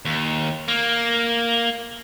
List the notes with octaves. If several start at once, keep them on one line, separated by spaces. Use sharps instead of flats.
D#2
A#3